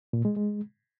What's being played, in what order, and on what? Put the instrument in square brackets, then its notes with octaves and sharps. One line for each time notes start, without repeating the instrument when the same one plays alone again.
[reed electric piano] A#2
G#3
G#3